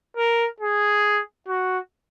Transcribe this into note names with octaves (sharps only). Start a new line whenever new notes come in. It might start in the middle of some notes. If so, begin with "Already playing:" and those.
A#4
G#4
F#4